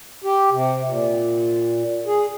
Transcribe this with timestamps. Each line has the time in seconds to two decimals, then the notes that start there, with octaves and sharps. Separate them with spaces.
0.24 G4
0.52 C3
0.87 A#2
2.06 G#4